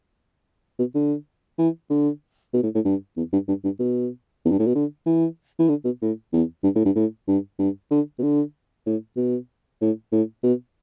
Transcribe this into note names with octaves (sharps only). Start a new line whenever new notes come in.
B2
D3
E3
D3
B2
A2
A2
G2
E2
G2
G2
G2
B2
E2
G2
A2
B2
D3
E3
E3
D3
B2
A2
E2
G2
A2
G2
A2
G2
G2
D3
B2
D3
A2
B2
A2
A2
B2